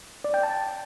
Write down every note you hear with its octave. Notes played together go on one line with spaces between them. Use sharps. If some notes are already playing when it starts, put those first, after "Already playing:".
D5
G5
A5